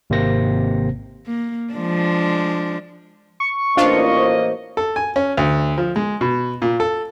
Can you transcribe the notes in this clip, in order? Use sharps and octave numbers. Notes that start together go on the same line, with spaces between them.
G#1 C3 A#3 C4 C5 A#6
A#3
F3 G#3 D4
C#6
A1 A#3 D4 F4 C5 D#5
C5
A4
G#5
C#4
D2
F3
G#3
B2
A#2
A4